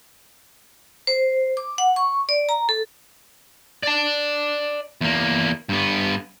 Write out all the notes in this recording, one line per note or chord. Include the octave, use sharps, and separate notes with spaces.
C5
D6
F#5
C#6
D5
A#5
A4
D5 A5
E2 A#3
G2 B3